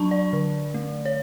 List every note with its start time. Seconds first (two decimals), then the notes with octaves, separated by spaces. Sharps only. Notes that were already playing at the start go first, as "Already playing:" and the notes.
Already playing: F#3 D4 A5 B5 C#6
0.11 D5
0.33 D3
0.74 A3
1.05 C#5